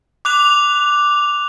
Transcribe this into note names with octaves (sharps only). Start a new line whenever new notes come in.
D6 F#6 F7